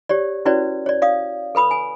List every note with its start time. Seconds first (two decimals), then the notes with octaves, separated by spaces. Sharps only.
0.09 G4 C#5 D5
0.45 C#4 E4 F#4 B4 C#5 D5
0.86 C#5 D5
1.02 D5 F5 D#6
1.55 A4 B4 B5 D#6
1.71 G#5